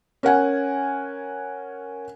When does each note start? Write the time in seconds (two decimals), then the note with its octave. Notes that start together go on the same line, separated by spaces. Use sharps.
0.23 C#4 A#4 F#5 G#5